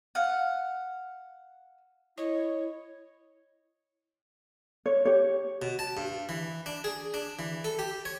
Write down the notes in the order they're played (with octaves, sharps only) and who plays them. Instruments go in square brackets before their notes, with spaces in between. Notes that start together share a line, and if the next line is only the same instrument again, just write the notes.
[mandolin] F5 F#5
[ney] E4 [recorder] C#5 [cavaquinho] D#5
[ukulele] C#5
G4 C#5
[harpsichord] B2
A5
G2
E3
D4
G#4
D4
E3
A4
G4
C#5